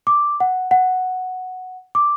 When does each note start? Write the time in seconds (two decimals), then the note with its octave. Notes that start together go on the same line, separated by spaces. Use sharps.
0.07 D6
0.40 F#5
0.71 F#5
1.95 D6